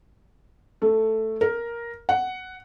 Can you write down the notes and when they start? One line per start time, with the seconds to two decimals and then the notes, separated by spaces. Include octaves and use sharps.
0.82 A3
1.41 A#4
2.09 F#5